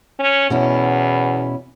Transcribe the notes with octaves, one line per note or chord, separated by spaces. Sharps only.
C#4
E2 B2 C#4 E4